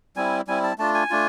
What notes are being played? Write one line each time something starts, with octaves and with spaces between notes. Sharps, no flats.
G3 C4 E4 G#5
G3 C4 E4 G#5
A5
A3 D4 F4 A5
G#5
A3 D4 F4